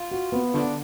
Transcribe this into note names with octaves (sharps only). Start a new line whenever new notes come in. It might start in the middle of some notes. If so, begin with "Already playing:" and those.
Already playing: F4
F#4
B3
D3 F3 A3 D4